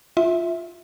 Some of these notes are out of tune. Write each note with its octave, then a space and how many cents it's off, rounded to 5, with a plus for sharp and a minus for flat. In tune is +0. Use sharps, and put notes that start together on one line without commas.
F4 +0 E5 -5